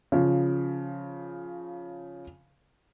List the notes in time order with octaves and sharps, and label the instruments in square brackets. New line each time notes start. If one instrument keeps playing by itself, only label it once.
[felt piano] C#3 F3